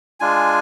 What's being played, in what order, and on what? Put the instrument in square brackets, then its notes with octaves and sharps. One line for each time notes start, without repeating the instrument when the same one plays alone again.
[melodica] G#3 D4 F4 G#5